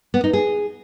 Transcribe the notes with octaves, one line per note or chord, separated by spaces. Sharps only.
B3
D#4
G#4